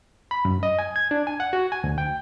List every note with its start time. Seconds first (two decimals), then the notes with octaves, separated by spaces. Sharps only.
0.31 B5
0.45 F#2
0.63 D#5
0.79 G#5
0.96 G#6
1.11 D4
1.27 G#5
1.40 F#5
1.53 F#4
1.72 G#5
1.84 D2
1.98 G5